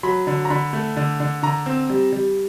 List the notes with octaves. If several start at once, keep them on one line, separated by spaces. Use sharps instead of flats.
F#3 B5
D3
A#5
D3 B5
A3
D3
D3
D3 A#5
C4
G3
G3